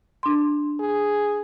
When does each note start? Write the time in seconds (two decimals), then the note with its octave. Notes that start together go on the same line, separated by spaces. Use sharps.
0.23 D4 C6
0.80 G#4